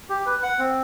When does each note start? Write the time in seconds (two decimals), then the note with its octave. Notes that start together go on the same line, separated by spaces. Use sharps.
0.10 G4
0.26 B4
0.43 F#5
0.59 C4